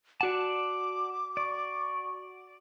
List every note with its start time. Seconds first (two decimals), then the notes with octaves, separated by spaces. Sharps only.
0.21 F#4 D5 F#5 A5 D6
1.37 D5 C#6